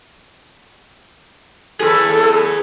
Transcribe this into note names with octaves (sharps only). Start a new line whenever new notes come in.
G#4 A4 B4